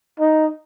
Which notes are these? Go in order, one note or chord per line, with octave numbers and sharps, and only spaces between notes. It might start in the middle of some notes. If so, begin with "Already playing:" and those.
D#4